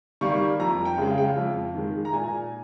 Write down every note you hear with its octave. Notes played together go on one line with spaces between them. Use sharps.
D#3 G3 A#3 C#6
F2 A#5
G5
C#3 G#3
F5
G5
F5
F2
D#3 G#3
A#5
A#2 G#5